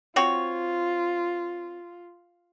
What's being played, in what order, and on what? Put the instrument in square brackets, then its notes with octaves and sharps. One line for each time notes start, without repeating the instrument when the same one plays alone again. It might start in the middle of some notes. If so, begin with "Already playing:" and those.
[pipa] C4 F#4 C#5 [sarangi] F4